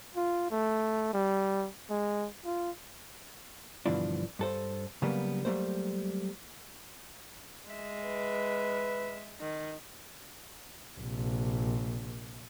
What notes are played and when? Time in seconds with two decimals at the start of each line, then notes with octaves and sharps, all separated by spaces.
0.16 F4
0.51 A3
1.13 G3
1.90 G#3
2.45 F4
3.86 G2 B2 D3 E3 F3 D4
4.39 G2 A4 C5
5.02 C#3 F#3 G3 A#3 B3
5.45 F#3 G3 A3 A#3 C5
7.70 G#3 E5
8.05 B4
9.41 D#3
10.98 A#1 C3